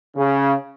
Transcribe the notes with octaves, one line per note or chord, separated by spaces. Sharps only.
C#3